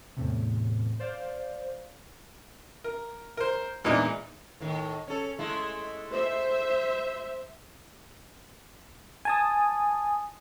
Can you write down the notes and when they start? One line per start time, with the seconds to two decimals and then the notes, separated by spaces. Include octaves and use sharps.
0.17 E2 A2 C3
1.00 C5 D5 F5
2.84 A#4
3.37 A#4 C5
3.84 E2 A#2 E3 G#3 D4 D#4
4.60 A2 D#3
5.08 C#4 A4
5.39 G#3 A3 E4
6.11 C5 E5
9.25 G#5 A5 D#6